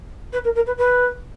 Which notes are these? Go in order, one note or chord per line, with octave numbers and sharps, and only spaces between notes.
B4
A#4
A#4
B4
B4